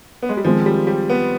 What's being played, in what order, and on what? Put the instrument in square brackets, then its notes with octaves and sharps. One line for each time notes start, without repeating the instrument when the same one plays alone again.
[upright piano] B3
G#3
G3
[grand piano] D#3 G#3 C4 [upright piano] F3
[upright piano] G3
G3
B3